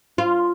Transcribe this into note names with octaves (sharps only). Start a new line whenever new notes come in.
F4